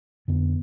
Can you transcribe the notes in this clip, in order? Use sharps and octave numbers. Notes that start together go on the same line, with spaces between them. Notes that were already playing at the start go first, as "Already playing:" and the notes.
F2 D3 B3